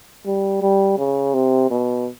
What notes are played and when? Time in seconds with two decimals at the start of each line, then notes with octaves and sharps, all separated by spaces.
0.26 G3
0.62 G3
0.98 C#3
1.34 C3
1.71 B2